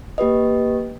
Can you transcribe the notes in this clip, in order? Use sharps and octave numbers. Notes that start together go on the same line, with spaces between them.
A#3 G4 B4 D#5